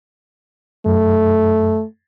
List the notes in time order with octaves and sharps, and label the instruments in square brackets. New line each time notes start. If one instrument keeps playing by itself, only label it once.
[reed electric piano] F#2 [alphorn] A3